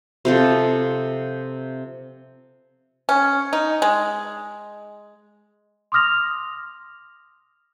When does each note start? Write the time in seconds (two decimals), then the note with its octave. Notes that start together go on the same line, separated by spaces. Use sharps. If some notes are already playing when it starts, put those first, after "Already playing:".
0.25 C3 F3 A4
3.09 C#4
3.53 D#4
3.82 G#3
5.92 C6 D6 D#6 F6 A#6 F7